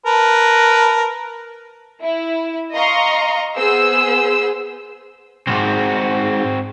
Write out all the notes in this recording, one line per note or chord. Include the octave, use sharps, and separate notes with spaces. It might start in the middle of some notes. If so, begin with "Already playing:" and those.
A#4 B4 A5
E4
D#5 F5 A#5 C6 C#6
B3 G#4 C5 E6
B1 G#2 C4 F#4